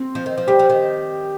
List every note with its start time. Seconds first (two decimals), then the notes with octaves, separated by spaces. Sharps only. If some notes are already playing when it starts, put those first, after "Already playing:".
Already playing: C4
0.15 F3
0.26 D#3
0.38 F3
0.47 G3 G4
0.59 F3
0.70 D#3